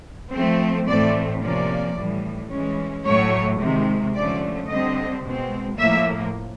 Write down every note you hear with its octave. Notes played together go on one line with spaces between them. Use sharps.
F3 A3 C4
A2 E3 A3 C4 D5
C3 F3 A#3 C#4 D5
A2 E3 G3
E3 G#3 C#4
A2 F#3 A3 C#5
C3 D#3 G#3
D3 F3 A3 C#4 D5
D3 G3 C4 D#5
B2 G#3 C4
A2 F3 A#3 E5